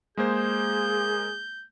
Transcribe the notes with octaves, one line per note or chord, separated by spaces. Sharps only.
G#3 A#3 G#4 C5 G6